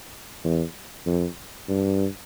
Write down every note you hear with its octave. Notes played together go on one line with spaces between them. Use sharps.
E2
F2
G2